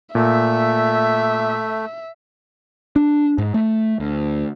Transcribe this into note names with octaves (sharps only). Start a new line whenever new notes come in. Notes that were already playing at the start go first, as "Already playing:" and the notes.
A#2 A3 E5
D4
G#2
A3
D2